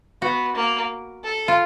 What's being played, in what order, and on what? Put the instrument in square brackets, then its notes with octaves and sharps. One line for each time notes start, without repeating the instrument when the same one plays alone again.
[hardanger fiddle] B3 [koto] F#4
[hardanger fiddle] A#3
A4
[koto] F4